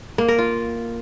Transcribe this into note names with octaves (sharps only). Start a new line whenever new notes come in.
A#3
A#4
F4